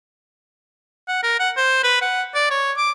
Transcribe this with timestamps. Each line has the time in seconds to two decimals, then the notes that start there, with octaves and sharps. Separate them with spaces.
1.08 F#5
1.23 A#4
1.40 F#5
1.57 C5
1.83 B4
2.01 F#5
2.34 D5
2.50 C#5
2.77 D6